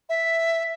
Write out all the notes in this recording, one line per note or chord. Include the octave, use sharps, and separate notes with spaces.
E5